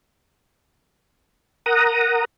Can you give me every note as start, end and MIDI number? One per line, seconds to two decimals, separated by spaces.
1.66 2.25 70
1.66 2.25 78
1.66 2.25 82
1.66 2.25 87